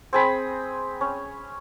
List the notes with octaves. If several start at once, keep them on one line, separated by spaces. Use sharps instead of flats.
C4 G#4 B5
C#4